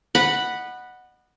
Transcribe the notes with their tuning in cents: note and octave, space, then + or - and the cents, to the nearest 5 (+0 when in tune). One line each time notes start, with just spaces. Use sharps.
D#5 -40 F#5 +0 B5 -5